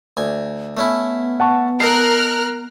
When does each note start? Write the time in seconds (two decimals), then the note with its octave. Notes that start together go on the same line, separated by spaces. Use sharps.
0.17 D2 G#5
0.77 A3 B3 C#4 E4
1.40 F#5 A5 C#6
1.80 D#4 A4 A#4 F6 F#6 C7